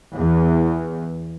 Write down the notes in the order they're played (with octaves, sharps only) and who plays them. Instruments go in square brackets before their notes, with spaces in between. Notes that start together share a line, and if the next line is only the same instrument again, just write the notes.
[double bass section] E2